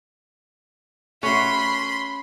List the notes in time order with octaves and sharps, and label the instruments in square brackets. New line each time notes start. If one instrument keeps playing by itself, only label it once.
[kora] A3 C#4 F#4 [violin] B5 C6